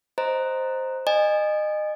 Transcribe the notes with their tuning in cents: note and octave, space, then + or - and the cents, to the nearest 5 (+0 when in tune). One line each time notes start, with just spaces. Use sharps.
C5 +0 D#5 +0 A#5 +0
D#5 -30 G#5 -20